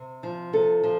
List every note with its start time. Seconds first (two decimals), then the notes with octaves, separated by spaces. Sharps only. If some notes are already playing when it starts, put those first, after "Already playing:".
Already playing: C3
0.23 F3
0.53 C3 A4
0.83 F3